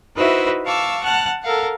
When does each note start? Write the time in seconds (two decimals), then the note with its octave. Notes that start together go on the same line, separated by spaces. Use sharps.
0.15 D#4 E4 F#4 B4 C5 E5
0.64 F5 A5 C#6 D6 E6
1.03 F#5 A5 F6 F#6
1.42 A4 A#4 F5 F#5